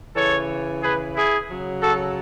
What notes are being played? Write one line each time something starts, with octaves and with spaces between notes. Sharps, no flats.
C#3 E3 A4 C#5
G#4 B4
E4 G#4
C#3 F#3
F#4 A4